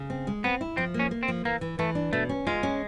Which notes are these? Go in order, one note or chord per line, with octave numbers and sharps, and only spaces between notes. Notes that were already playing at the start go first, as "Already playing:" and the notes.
Already playing: C#3
C4
G#3
B3 C4
E4
F3 C4
A#3
C#4
A#3
C4
F3
E3 A#3
E3
E3 A3
D4
B2 A3
C#4
G#3 F4
C#4